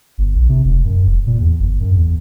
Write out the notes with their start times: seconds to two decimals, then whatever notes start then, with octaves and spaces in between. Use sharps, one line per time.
0.18 G1
0.35 A#1
0.49 C3
0.65 E1
0.84 F#2
1.06 E1
1.27 A#2
1.40 E2
1.59 G1
1.80 F#2
1.95 E2